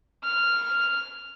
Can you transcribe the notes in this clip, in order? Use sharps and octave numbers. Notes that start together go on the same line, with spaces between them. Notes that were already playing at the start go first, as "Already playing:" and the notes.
F6